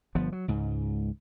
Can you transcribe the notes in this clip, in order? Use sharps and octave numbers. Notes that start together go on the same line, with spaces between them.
G1 F3 B3
F#3
C#2 G#2